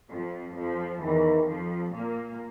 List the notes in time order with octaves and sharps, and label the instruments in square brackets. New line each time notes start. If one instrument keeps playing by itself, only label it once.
[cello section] F2 F3
F2 F3
[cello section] E2 E3 [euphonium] D#3
[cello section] F2 F3
A#2 A#3